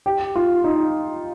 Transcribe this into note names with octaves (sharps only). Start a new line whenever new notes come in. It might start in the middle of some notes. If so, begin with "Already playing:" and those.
G4
F4
D#4